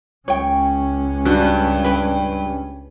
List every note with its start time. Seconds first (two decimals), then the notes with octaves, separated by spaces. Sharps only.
0.28 C#2 C#4 C#5 G5
1.25 G2 F#4
1.84 B4 G5